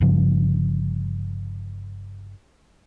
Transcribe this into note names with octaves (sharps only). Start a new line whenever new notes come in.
G1 G2 C#3 F3